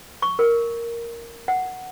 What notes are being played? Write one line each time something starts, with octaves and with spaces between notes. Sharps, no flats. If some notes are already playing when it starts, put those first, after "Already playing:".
C#6
A#4
F#5